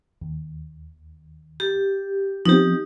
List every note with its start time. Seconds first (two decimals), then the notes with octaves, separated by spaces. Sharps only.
0.22 D#2
1.60 G4
2.46 F3 B3 C4 D#4 G4